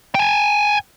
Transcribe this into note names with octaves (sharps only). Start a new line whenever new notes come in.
G5 G#5